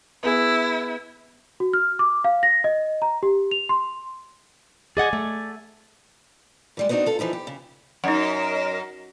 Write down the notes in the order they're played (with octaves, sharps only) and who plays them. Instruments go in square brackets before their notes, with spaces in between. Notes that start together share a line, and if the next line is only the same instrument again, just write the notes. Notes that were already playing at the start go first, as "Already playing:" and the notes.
[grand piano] B3 G#4 [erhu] E4
[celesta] F#4
F6
D6
F5
A#6
D#5
A#5
G4
F7
C6
[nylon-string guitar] G#4 D#5 F#5 [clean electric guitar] D5 G#5
[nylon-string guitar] A3
[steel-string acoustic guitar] E3 G3 G#3
B3 C4 D4 D#4 F#4
F4 A4
E3 F3 D#4 E4
G4
C#3
[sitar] F#2 [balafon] D#4 F#5 [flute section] A#4 D#5